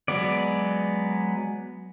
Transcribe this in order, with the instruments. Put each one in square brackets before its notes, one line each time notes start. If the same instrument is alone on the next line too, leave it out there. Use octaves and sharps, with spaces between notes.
[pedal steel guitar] F#3 G#3 B3 D5